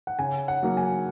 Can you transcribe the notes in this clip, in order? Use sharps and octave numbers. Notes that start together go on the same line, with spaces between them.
F#5
C#3 G#5
F#5
F#3 A#3
G#5